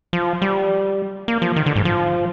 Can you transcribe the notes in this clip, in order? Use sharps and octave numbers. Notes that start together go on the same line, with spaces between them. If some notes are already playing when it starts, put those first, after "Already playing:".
F3
G3
A#3
F3
D#3
D3
G#2
F3